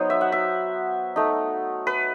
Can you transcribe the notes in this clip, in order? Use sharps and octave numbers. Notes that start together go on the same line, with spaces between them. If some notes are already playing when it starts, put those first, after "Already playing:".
Already playing: F#3 B3 D#4 C5
E5
F#5
E5
A3 D#4
B4